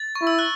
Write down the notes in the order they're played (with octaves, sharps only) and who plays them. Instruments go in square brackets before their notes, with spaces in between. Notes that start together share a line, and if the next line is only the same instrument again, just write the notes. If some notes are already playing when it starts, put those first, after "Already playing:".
Already playing: [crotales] A6
C#6
[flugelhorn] E4
[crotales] E6
F#6